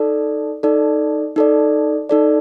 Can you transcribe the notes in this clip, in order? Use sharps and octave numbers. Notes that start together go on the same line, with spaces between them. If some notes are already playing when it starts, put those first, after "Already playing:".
Already playing: D#4 A4 D5
D#4 A4 D5
D#4 A4 D5
D#4 A4 D5